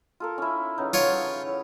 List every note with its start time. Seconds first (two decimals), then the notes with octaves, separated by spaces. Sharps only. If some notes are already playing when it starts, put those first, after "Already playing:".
0.20 F4 A4 A#4
0.38 C#4 D#4 E4
0.78 C#3 E3 F#3 D#4
0.94 F4 C#5
1.19 E4
1.47 E4 C#5